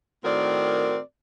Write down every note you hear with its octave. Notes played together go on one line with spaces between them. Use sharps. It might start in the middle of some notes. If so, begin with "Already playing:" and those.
A2 D#3 C4 F#4 A#4 D5